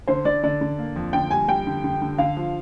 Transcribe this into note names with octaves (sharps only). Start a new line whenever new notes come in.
D3 C5
D3 D5
D3 D5
D3
A#3
F2
D3 G5
G3 G#5
G3 G5
D3
D3
D3
D3 F5
F3